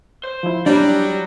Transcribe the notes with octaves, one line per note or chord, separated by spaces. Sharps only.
C5
F3 E4
F#3 G3 D4